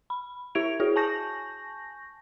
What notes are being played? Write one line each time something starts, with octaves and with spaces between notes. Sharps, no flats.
B5
E4 G4 E5 G#6 D7 F7
E4 F#4 G#4 C#5
G#5 A5 C#6 G6 A#6